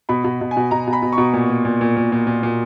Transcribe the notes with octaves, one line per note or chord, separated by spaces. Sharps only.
B2 B5
B2
B2
G#5
B2
B2 A#5
B2
B5
B2
C#6
B2
A#2
A#2
A#2
A#2
A#2
A#2
A#2
A#2